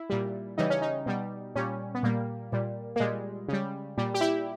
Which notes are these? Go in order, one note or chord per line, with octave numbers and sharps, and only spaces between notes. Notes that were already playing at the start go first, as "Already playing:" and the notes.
Already playing: E4
A#2 G3
C#3 E3 G3 D#4
C#4
D#4
B2 G3
A#2 G3 C#4
B3
A#2 G3 A#3
A#2 G3
A#3
A#2 G3 G#3
C#3 G3
A#2 G3
G4
E4